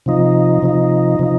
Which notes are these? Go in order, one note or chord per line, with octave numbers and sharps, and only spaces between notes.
C3 F3 D#4
C3 F3 D#4
C3 F3 D#4